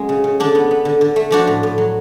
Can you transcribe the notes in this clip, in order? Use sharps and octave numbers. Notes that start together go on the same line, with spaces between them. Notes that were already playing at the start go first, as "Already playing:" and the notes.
Already playing: F#3 G#3 C#4
C#3
C#3
D3 D4
B3
B3
D3
D3
A3
F3 D4 F#4
A2
A2
F#3